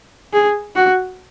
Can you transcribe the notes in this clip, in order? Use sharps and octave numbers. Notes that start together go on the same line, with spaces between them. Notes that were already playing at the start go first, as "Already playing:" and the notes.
G#4
F#4